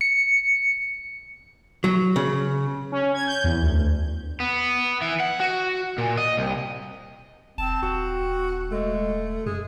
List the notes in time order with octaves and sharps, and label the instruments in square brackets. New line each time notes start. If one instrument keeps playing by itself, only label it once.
[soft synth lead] C#7
[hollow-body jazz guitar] F#3
C#3
[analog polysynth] C#4
G#6
G6
E2
D2
[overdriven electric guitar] B3
E3
F#5
F#4
A#2
D#5
C2
[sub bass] E1 [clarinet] C4 [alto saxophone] A5
[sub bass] D#1 [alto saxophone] F#4
[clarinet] G#3 [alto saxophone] A3
[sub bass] F#2 [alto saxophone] G#3 [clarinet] G#4